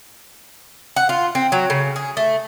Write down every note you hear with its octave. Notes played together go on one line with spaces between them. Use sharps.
F#5
F4
C4
F#3
C#3
G#4
A3